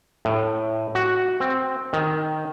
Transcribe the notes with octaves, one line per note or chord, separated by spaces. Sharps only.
A2
F#4
C4
D#3